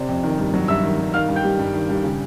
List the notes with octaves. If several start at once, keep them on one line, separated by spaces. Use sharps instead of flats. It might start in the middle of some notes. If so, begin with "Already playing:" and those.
Already playing: C3 C5 D5
F2
D#3
G2
F#3
G2 E5 E6
D#3
G2
D#3 F5 F6
G2
G5 G6
G3
G2
D#3
G2
C#3